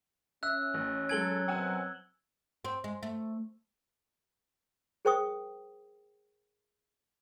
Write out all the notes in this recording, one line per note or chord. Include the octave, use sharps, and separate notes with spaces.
C#4 E5 E6 F#6
A1
F#3 G#3 A4 G#6 D7 F#7 G7
F#2 B2 C4 F#5 G#5 E6
C4
G#3
A3
G#4 A#4 C5 G5 C#6 D#6